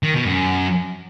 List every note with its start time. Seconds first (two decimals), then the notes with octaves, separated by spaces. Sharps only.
0.03 D#3
0.14 B2
0.26 F#2